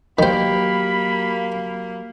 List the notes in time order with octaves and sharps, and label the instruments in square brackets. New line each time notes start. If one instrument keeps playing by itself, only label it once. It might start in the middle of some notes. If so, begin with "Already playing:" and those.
[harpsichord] D#3 C5 [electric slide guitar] F#3 G4 [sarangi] A#3 [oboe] B5